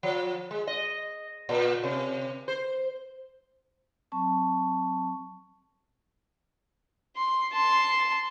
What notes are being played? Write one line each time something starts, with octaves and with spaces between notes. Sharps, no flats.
F3
G#3
D#5
A#2
C3
C5
F#3 C4 A5 C#6
C6
A5 C6